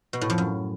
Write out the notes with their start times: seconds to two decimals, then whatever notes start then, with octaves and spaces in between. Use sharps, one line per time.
0.13 B2
0.21 A2
0.30 F2
0.38 F#2